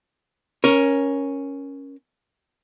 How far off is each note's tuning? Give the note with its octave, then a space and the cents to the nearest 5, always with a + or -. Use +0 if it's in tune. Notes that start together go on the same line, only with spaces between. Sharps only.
C#4 +0 A#4 +15